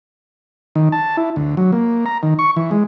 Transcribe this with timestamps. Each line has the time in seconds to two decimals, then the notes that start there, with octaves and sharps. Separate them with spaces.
0.76 D#3
0.92 A5
1.17 E4
1.36 D2
1.57 F#3
1.72 A#3
2.06 A#5
2.23 D#3
2.39 C#6
2.56 E3
2.71 G#3